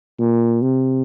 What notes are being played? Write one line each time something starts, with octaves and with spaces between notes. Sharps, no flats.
A#2
C3